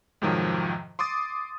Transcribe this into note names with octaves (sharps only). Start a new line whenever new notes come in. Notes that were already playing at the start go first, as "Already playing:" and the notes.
F2 G#2 C3 D#3 F3 F#3
C6 D6 D#6 A6